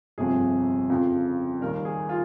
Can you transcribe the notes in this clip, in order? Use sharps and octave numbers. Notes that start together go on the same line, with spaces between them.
G1 F2 C3 F3 G#4
F2 C#3 F3
D#2 D#3 G3 A#4
G#4
F4